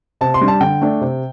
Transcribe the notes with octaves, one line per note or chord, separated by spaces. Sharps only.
C3 A5
C6
G3 D4
A5
D3 G5
A3 D4
C3